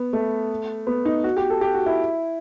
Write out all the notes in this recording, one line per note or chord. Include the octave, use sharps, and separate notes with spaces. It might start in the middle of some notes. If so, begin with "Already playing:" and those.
Already playing: B3
A3
B3
D#4
F#4
G4
A4
G4
F#4
E4